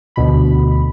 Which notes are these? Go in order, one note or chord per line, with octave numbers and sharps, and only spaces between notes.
D2 B2 B5